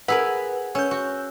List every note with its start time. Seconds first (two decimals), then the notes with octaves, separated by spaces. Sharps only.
0.08 E4 G#4 A#4 B4 F#5
0.75 C#4 E6 G6
0.91 F#4